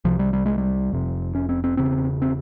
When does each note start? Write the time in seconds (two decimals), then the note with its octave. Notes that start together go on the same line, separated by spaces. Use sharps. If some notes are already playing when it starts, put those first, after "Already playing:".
0.05 C2 C3 F3
0.19 G3
0.33 G3
0.46 G#3
0.58 G3
0.92 F1 F2 C3
1.35 C#4
1.49 C4
1.64 C4
1.77 E1 E2 C#3 C4
2.22 C4